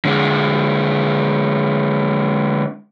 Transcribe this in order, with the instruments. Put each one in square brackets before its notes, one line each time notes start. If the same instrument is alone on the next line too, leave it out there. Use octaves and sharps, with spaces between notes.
[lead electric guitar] D3 G#3